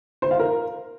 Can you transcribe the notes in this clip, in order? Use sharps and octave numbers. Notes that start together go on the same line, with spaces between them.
C5
F5
A#4